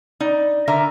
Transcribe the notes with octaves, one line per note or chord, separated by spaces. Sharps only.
D#4 D5
D3 A#4 E5 A#5